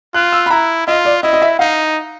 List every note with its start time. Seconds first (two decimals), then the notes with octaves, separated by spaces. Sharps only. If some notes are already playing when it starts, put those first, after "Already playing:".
0.14 F4 F#6
0.32 E6
0.46 B5
0.50 E4 A#5
0.87 F4 D#5
1.05 D5
1.23 E4 D#5
1.33 D#5
1.42 E5
1.59 D#4 F5